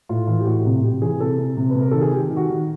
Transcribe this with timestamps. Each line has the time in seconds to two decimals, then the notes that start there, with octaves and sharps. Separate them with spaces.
0.09 A2 F4
0.27 E3 F4
0.40 G4
0.46 A2 F#4
0.65 C3
0.83 C3 G4
1.02 E3 G#4
1.20 C3 A4
1.39 C3
1.57 C3
1.70 B4
1.75 C3
1.81 A#4
1.91 D#3 A4
2.01 G#4
2.12 D#3 G4
2.30 D#3
2.37 F#4
2.50 D#3